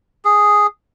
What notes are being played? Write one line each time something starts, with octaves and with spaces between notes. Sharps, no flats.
G#4